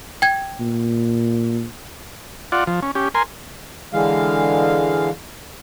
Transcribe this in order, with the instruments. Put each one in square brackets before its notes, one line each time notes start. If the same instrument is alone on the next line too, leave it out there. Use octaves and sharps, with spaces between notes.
[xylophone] G5 G#6
[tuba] A#2
[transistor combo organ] F4 D5 F#5
F3
C#4
C#4 G4
A#4 G#5 C6
[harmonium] D3 E3 G#3 F5